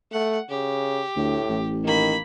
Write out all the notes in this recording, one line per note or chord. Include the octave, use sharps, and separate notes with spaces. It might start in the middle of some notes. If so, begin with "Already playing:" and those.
A3 F#5
C#3 G4
D2 A2
A1
D#3 A#3 B5